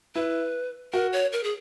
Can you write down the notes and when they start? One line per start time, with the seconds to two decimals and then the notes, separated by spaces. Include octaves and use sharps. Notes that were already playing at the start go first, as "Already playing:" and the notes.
0.15 E4 B4
0.93 F#4 A#4
1.13 C#5
1.32 A#4
1.44 G#4